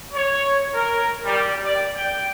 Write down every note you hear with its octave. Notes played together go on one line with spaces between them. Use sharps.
C#5
A#4
G3
D5
G5